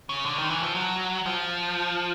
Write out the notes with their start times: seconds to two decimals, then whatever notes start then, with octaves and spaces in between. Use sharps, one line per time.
0.09 C#3
0.26 D3
0.38 D#3
0.50 E3
0.63 F3
0.75 F#3
1.26 F3